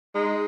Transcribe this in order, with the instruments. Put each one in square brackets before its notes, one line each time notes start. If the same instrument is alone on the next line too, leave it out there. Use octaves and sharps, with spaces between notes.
[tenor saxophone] G#3 [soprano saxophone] D#4